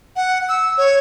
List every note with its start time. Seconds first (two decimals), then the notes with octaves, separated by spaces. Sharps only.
0.16 F#5
0.49 E6
0.77 C#5